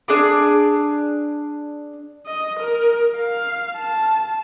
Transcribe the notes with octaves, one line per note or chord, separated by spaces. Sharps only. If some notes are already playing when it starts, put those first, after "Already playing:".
D4 G#4 D6
D#5
A#4
F5
A5